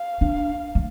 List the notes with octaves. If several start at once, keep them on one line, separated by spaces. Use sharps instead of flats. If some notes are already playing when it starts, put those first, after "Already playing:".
Already playing: F5
D4
A3